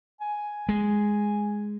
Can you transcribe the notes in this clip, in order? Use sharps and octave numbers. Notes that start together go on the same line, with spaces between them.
G#5
G#3